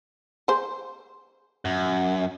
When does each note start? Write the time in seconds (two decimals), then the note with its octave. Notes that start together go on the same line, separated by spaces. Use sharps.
0.48 G#4 C5
1.65 F#2